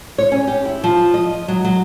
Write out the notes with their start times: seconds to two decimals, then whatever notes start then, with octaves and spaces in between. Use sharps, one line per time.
0.18 C#5
0.32 C#4
0.47 G4
0.65 E4
0.84 F3
1.14 D#5
1.48 F#3
1.65 F#3